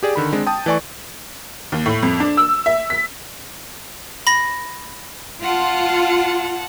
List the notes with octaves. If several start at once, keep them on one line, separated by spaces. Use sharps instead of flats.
G4 G#4 D5
D3 D#3 B5
G#3 C4 D4
G5 A5 D#6
E3 A3 D5 G#5 C#6
D#2
A2
F2
D4
E6
E5
B6
B5 A#6
F4 F#5 A5